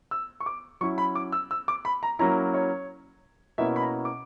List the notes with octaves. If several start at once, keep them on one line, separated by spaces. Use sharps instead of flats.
E6
C#6
D6
F#3 C#4 E4 C#6
B5
D6
E6
E6
D6
B5
A#5
F#3 A#3 C#4 E4 A#5
C#5
B2 A#3 C#4 E4 E5
B5
A#5
D6